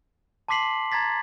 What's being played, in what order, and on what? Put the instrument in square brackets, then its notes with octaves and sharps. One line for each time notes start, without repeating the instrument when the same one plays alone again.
[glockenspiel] A5 C6 D6 B6 C7 F#7
A#5 G#6 A6 B6